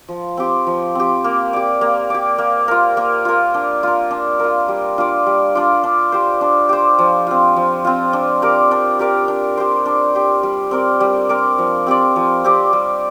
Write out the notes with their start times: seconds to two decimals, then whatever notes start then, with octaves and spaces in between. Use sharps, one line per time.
0.09 F3
0.37 C4 G4
0.67 F3
0.95 C4 G4
1.24 A#3
1.53 G4 D5
1.81 A#3
2.10 G4 D5
2.38 A#3
2.68 F4 A#4
2.97 A#3
3.25 F4 A#4
3.54 D4
3.83 F4 A#4
4.11 D4
4.39 F4 A#4
4.68 G3
4.98 D4 F4 D5
5.27 G3
5.55 D4 F4 D5
5.84 D4
6.12 G4 C5
6.41 D4
6.69 G4 C5
6.99 F3
7.27 C4 F4
7.56 F3
7.85 C4 F4
8.13 D4
8.42 G4 A#4 D5
8.71 D4
8.99 G4 A#4 D5
9.28 D4
9.57 G4 C5
9.86 D4
10.15 G4 C5
10.43 G3
10.71 C4 A#4 D5
11.00 G3
11.29 C4 A#4 D5
11.58 F3
11.87 C4 G4 D5
12.16 F3
12.44 C4 G4 D5
12.73 G3